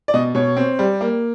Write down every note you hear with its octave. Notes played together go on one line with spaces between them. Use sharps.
D5
B2 D#5
B2 C#5
C4
G3
A#3